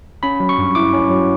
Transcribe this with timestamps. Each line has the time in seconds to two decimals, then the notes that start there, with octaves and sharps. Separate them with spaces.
0.23 C#4 B5
0.40 F#3
0.49 C#6
0.58 G2
0.75 E4 D6
0.93 C#4
1.10 F#3